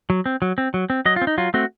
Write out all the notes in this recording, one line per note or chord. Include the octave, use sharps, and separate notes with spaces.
F#3
C4
F#3
C4
F#3
C4
F#3 D#5
F4
C4
D#4
F#3 F4
A3 C4 F#4